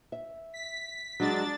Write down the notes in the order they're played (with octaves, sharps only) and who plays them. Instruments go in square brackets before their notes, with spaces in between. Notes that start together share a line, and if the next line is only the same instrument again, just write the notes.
[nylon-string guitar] E5
[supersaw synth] B6
[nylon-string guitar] F#3 G#3 [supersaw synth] D4 A6